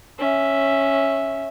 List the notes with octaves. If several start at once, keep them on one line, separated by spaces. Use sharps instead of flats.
C#4 E5